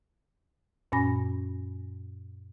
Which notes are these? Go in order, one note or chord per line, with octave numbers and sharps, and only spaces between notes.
F#2 A#2 C#4 G#5 B5 A#6